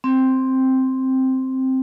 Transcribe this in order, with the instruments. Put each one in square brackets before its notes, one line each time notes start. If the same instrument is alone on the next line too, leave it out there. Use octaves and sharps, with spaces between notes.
[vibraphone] C4